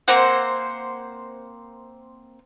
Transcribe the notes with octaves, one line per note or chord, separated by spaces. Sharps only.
A#3 C4 C5 F#5